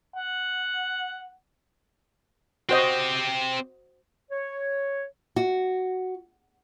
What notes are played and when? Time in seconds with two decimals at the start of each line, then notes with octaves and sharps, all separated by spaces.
0.16 F#5
2.69 C4 F#4 G4 C5 D#5
4.30 C#5
5.36 F#4